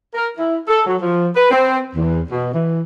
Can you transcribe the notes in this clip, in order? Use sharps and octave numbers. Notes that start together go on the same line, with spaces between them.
A#4
E4
A4
F#3
F3
B4
C4
E2
B2
E3